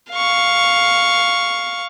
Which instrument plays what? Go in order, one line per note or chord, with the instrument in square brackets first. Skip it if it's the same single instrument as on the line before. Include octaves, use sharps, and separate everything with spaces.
[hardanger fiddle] F5 C#6